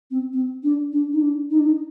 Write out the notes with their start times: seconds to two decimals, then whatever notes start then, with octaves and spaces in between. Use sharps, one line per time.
0.10 C4
0.32 C4
0.63 D4
0.92 D4
1.12 D#4
1.20 D4
1.50 D#4
1.58 D4
1.66 D#4